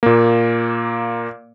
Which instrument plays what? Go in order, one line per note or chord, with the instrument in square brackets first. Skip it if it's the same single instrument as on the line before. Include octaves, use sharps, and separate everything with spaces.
[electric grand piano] A#2 A#3